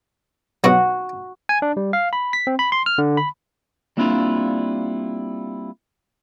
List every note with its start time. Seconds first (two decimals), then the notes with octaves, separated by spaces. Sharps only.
0.64 B2 F#3 F#4
1.49 G#5
1.62 D4
1.77 G3
1.93 F5
2.13 B5
2.33 B6
2.47 C4
2.59 B5
2.72 C6
2.86 F6
2.98 D3
3.17 B5
3.97 G3 A#3 C4 D4 E4 F4